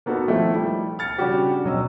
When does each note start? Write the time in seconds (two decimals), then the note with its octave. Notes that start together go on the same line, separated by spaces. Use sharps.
0.06 A#3 B3 D#4 F#4 A4
0.26 D#3 F3 A3 E4 A4
0.56 G3
0.99 F6 A6 C#7
1.18 C#3 G3 D4 F#4 G4
1.64 B2 F#3 D#5 E6